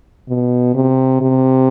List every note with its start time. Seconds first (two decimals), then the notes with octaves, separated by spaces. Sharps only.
0.28 B2
0.75 C3
1.21 C3